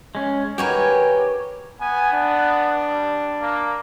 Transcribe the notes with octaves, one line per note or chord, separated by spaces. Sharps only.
G#3 C#4
D#3 F#4 G4 A#4 B4 C#5 G#5
B3 G#5
D4
G3
A#3